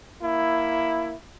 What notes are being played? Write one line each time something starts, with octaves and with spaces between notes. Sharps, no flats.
A#3 E4